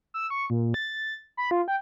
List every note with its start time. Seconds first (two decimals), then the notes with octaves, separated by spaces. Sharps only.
0.14 E6
0.30 C#6
0.50 A#2
0.74 A6
1.37 B5
1.51 F4
1.68 G5